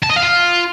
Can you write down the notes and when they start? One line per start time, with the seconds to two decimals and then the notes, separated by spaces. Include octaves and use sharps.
0.03 A5
0.10 D#5
0.16 F5
0.23 F4